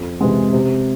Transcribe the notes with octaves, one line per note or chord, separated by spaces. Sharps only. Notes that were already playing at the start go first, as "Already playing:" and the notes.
Already playing: F2
C3 E3 G#3
C3